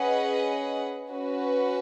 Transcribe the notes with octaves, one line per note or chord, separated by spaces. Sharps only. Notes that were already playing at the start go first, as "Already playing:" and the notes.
Already playing: C#4 G#4 B4 D#5 F#5
C#4 F#4 B4